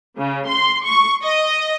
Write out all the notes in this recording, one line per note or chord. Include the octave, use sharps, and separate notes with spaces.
C#3
C6
C#6
D#5